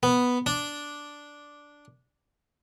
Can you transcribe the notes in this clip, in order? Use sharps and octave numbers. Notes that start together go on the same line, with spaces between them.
B3
D4